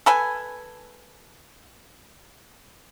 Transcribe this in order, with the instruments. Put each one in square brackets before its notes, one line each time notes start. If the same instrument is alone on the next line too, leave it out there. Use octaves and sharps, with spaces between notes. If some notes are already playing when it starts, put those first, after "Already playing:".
[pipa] A4 B4 G#5